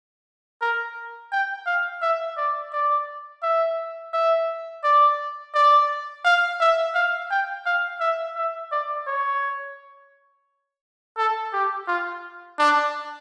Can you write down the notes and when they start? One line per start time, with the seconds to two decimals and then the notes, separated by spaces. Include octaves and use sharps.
0.62 A#4
1.32 G5
1.66 F5
2.02 E5
2.37 D5
2.73 D5
3.43 E5
4.13 E5
4.84 D5
5.54 D5
6.25 F5
6.60 E5
6.94 F5
7.31 G5
7.66 F5
8.00 E5
8.35 E5
8.72 D5
9.07 C#5
11.17 A4
11.53 G4
11.87 F4
12.59 D4